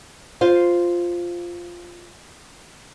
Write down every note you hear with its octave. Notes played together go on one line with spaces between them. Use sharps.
F4 C5 F5